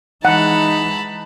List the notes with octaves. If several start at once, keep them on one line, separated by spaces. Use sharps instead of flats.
E3 G#3 D#4 F#5 A5 B5